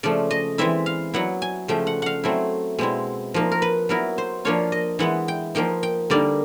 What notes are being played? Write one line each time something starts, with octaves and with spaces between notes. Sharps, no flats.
C#3 F3 A3 D5
D#5
E3 G#3 C4 E4 E5
F5
F#3 B3 E4 F#5
G#5
C#3 F3 A3 G5
F#5
F5 F#5
F#3 A3 C4 E4
B2 G#3 C4 E4
F3 A#3 D#4
A#4
B4
F#3 B3 E4 A#4
C5
F3 A#3 D4 F4 C#5
D#5
E3 G#3 B3 E4 F#5
G5
F3 A#3 D#4 G5
G5
D3 G3 A#3 D#4 D5